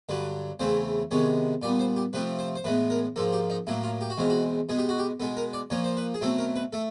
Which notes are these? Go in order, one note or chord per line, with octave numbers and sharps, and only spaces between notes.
G2 D3 F#3 B4
E2 C#3 E3 A3 C4 C5
C3 D#3 G#3 B3 C#5
A#2 G3 B3 D5
C5
G4
C3 F3 A3 C4 B4
C5
C5
A2 E3 G#3 B3 B4
A#4
G#2 F3 A#3 A4
G4
D#4
A2 F#3 A#3 E4
F4
G4
F#4
E2 B2 G#3 C4 F4
F#4
B2 G#3 B3 G#4
G4
F#4
G4
B2 G#3 B3 A4
A#4
D5
A#2 F3 A#3 C#5
C5
B4
G#4
B2 F#3 A3 C4 A4
A#4
B4
A3 A4